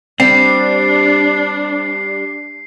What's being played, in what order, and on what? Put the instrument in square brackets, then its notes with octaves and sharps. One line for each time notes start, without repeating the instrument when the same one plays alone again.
[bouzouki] G3 [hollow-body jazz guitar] C4 [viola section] D4 [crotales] C7